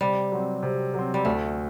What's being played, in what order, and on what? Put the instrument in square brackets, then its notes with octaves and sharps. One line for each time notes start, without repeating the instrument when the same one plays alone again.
[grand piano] C3 [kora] G3
[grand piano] F#3 C4
C3
F#3 C4
[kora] G3
[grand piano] D2 [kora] A3